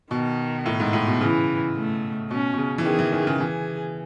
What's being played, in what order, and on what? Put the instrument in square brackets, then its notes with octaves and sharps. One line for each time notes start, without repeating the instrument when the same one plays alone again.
[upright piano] B2 [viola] D#3
[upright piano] A2
G#2
A2
B2
[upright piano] C#3 [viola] E3
[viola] A3
[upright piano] B2 [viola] C#4
[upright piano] B2
C#3
E3
[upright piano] D#3 [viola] G#4
[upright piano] E3
D#3
C#3
[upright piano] E3 [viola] G#4